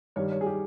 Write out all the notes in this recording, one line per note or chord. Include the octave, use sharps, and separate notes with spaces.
G2 D#3 G3 C#5
C#5
G#4
G4